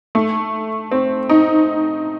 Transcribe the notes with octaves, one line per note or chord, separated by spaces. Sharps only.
A3
C4
D#4